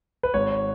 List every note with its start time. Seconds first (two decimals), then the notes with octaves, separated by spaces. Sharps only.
0.23 B4
0.34 G#1 C#5